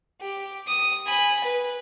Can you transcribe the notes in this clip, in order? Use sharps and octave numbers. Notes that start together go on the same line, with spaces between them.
G4
D#6
G#5 B5
B4